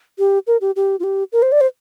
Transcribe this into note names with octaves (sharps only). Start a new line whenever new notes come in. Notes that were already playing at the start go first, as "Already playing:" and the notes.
G4
A#4
G4
G4
F4
G4
A#4
C5
D5
C5